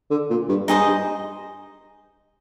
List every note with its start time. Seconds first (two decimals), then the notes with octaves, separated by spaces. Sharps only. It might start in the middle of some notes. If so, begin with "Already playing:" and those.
0.10 D3
0.30 A#2
0.48 G2
0.68 G2 D#4 G#4 C5 D#5
0.87 G2